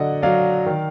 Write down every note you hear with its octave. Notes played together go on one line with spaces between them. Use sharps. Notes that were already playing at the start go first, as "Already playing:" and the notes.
Already playing: D3 F#3 D4 D5 D#5 F#5
F#3 D4 D5 F5
D#3